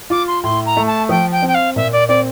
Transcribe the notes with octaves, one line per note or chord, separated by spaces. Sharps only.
F4 D6
C6
A2 C6
A#5
A3
A5
F3 G5
G5
C4
G5
F5
A#2 E5
D5
C4 D5